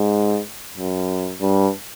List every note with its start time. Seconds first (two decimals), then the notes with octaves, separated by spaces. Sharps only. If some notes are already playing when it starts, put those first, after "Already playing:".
Already playing: G#2
0.78 F#2
1.41 G2